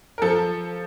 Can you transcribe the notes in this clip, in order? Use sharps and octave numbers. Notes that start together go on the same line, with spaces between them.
A#4
F3 A4